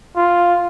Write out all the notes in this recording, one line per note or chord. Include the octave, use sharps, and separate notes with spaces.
F4